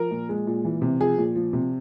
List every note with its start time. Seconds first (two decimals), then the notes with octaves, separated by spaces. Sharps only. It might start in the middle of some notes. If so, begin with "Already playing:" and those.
Already playing: F3 A#4
0.11 A#2
0.29 G#3
0.47 A#2
0.65 E3
0.82 C3
1.01 F3 G#4
1.18 A#2
1.35 F3
1.53 C3